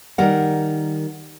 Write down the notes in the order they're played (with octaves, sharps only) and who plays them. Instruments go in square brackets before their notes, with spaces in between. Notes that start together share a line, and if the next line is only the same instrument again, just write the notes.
[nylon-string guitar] D#3 G3 A#4 F#5